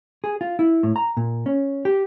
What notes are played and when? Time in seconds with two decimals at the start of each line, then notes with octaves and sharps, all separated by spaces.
0.24 G#4
0.41 F4
0.59 E4
0.83 A2
0.96 A#5
1.17 A#2
1.46 C#4
1.85 G4